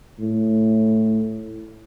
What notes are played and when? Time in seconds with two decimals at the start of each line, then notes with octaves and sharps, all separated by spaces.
0.19 A2